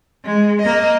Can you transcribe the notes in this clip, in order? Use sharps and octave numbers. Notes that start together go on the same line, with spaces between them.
G#3
A#3 D#5